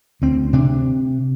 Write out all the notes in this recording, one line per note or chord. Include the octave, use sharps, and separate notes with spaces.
D2 C4
C3 D4